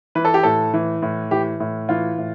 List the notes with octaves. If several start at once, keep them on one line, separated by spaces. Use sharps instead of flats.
E3 B4
A4
G4
A2 A4
E3
A2
E3 G4
A2
E3 F4
A2